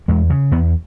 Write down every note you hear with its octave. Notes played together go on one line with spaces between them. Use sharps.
E2 G#3
C#3
E2 B3